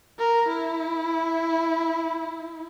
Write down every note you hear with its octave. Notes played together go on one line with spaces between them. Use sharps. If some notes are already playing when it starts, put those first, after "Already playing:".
A#4
E4